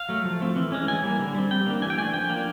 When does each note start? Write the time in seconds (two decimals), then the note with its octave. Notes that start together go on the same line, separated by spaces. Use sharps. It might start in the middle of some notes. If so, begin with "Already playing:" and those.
Already playing: F5
0.09 F#3 A3
0.25 F3
0.41 A3 C4
0.56 E3
0.72 G#3 C#4
0.88 E3 G#5
1.03 G3 A#3
1.19 D3
1.34 G3 C4
1.51 G3 G5
1.66 A#3 D4
1.82 E3 G#5
1.90 G5
1.97 A3 D4 G#5
2.14 F3 G5
2.29 A#3 D4